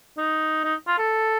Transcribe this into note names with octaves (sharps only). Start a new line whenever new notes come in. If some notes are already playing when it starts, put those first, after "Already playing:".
D#4
D#4
F4
A4